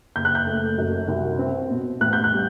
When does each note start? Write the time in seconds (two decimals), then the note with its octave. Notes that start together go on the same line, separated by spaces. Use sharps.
0.16 F#1 G6
0.25 F#6
0.35 G6
0.47 A3
0.78 F#2
1.08 C2
1.39 C4
1.70 B2
2.01 A1 F#6
2.13 G6
2.24 F#6
2.32 G3